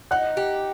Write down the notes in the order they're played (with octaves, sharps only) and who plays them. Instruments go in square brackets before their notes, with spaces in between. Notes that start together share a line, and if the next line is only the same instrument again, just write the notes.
[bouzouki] D#4 [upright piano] F#5 F#6
[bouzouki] G4